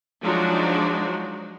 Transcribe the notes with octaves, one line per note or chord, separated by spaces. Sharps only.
F3 F#3 G#3 D4 D#4 F#4